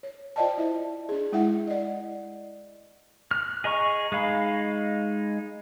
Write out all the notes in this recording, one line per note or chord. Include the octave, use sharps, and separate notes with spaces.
C#5
F4 C5 D5 D#5 G5 A5
E4 E5
D4 G#4
G#3 E4 E5 F#5
D5 D#5
F6 F#6
G#4 D#5 A#5 C#6
G#3 D#4 F5 B5